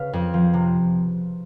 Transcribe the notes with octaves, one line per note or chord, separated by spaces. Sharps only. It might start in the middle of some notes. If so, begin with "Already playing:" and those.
Already playing: C#3 B4 F5
F2
F3
C3